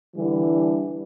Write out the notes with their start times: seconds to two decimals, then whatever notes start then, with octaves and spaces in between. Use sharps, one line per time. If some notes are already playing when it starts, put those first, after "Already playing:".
0.15 D3 E3 G3